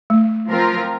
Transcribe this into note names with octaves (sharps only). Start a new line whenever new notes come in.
A3
F3 C4 F4 A#4